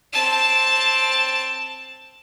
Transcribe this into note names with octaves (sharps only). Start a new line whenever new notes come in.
C4 A5